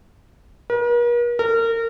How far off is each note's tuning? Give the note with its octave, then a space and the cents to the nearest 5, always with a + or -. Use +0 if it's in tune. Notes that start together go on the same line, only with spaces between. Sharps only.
A#4 +45
A#4 -30